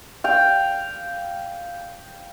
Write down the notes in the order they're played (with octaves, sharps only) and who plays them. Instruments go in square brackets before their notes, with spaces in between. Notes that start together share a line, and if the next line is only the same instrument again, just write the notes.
[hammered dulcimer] F5 G5